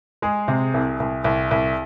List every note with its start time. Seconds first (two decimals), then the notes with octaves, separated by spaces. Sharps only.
0.22 G#3 G#4
0.48 C3
0.74 C2
1.00 C2
1.24 C2
1.51 C2